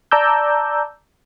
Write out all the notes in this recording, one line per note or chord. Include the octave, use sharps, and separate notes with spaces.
D5 A5 A#5 D6 E6 G6